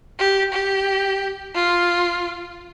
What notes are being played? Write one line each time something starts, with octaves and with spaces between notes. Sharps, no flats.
G4
G4
F4